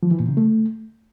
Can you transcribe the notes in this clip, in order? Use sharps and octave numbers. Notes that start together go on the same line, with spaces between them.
F3
E3
A#2
C#3
A3